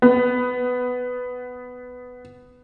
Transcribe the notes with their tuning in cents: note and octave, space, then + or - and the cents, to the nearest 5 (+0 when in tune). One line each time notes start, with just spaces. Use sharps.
B3 +10